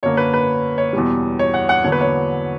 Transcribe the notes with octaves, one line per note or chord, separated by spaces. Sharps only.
F#2 D3 A#3 C#5
B4
B4
C#5
E2 B2 G3
C#5
F#5
F#5
E2 D3 F#3 A#3 C#5
B4
C#5